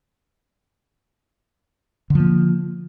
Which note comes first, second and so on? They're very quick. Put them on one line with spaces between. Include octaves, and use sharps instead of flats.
D3 F3 A#3